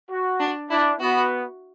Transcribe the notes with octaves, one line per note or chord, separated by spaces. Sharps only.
F#4
D4
D4 E4
B3 F#4